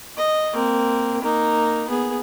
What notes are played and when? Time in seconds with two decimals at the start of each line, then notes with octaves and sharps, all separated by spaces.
0.18 D#5
0.53 A#3 C4
1.22 A#3 D#4
1.88 B3 G#4